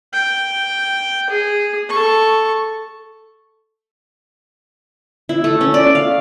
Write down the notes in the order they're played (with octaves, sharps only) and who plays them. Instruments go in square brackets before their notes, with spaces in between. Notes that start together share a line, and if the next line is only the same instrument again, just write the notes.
[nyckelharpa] G5
G#4
A4 C#6
[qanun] E4
A3
C#4
D5
F5